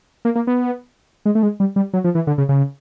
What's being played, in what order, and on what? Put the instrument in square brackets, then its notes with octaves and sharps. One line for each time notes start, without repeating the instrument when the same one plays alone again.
[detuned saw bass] A#3
A#3
B3
G#3
A3
G#3
G3
G3
F#3
F3
E3
D3
C#3
C#3